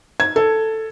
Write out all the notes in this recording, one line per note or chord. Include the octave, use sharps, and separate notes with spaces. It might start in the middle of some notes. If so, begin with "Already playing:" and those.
G#6
A4